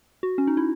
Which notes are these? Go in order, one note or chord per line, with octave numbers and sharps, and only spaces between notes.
F#4
C#4
D#4
E4